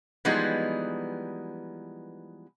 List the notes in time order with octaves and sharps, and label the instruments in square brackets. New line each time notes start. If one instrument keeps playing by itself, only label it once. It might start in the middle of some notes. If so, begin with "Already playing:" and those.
[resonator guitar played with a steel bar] E3 F3 G3 G#3 B3 D#4